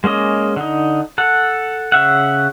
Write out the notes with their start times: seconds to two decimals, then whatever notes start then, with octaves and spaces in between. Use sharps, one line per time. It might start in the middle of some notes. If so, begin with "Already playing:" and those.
0.04 G#3 A#3 C#4 D#5
0.56 D3 D#4
1.18 A4 F#5
1.92 C#3 E5 F#5